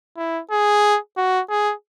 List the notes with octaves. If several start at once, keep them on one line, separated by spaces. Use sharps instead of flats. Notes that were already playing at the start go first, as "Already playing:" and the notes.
E4
G#4
F#4
G#4